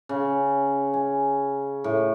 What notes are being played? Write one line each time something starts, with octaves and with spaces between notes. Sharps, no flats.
C#3
G#5
A2